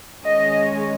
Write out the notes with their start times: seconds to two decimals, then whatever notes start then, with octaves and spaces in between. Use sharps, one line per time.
0.24 D#3 G#3 C#4 D#5